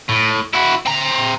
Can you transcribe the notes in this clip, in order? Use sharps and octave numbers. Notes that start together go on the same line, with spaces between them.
A2
E4 F#4
C4 A#5